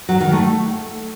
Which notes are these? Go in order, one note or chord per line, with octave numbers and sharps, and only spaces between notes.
F#3
D#3
A3